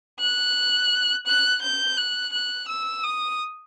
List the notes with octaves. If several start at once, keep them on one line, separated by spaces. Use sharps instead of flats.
F#6
F#6
G6
F#6
F#6
E6
D#6